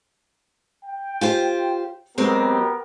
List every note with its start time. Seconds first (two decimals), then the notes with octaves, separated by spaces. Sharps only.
0.85 G5
1.21 F4 G4 C5
2.18 F#3 G#3 B3 C4 G4 A#4